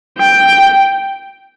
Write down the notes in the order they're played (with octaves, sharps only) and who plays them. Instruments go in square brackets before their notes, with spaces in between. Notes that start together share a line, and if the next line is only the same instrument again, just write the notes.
[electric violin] G5